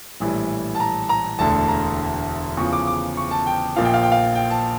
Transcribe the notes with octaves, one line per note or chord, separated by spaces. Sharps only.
A#1 A2 E3 G3
A5
A#5
A#5
E1 D2 D3 A5
A#5
E2 C#3 F3 C#6
D6
D6
C#6
A5
G5
A#1 A#2 F3 F5
G5
F5
G5
F5
G5
A5